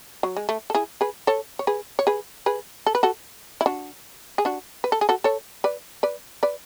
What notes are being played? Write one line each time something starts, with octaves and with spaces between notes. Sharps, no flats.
F#3
G#3
A3
A4
E4 G#4
G#4 B4
A4 C#5
C#5
G#4 B4
C#5
G#4 B4
G#4 B4
A4
B4
F#4 A4
E4
D4 F#4
G#4
D4 F#4
B4
A4
G#4
F#4 A4
A4 C#5
B4 D5
B4 D5
B4 D5